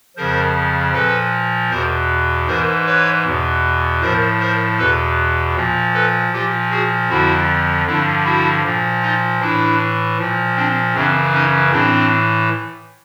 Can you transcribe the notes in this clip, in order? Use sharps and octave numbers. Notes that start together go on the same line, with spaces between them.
F2 C#3 F3 A#4 C5
A#2 F3 A4 B4
E2 B2 A#4 C5
G#2 E3 A#4 C5
B4 C#5
E2 B2
A2 F3 A#4 C5
A#4 C5
E2 B2 A4 B4
A#2 F3
A4 B4
A#2 F3 F4 G4
F#4 G#4
F2 D3 F3 E4 F#4
G2 D3 F3 D4 E4
E4 F#4
A#2 F3
D#4 F4
A2 E3 D4 E4
A#2 F3
C4 D4
F#2 C#3 E3 C4 D4
C#4 D#4
A2 E3 C4 D4